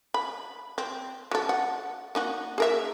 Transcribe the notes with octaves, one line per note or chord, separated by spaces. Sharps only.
B5
C4
F#3 A4
F#5
A#3 D#4 F#4
G#4 A#4 E5